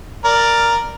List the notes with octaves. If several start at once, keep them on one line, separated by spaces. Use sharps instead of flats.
A#4 D5